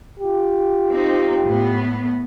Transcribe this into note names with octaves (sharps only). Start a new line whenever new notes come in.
F4 G4
C4 D#4
A2 B3